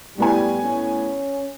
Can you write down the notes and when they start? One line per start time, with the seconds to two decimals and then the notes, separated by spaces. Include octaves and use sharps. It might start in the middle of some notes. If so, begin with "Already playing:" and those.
0.18 A2 G3 B3 G#5
0.64 C#4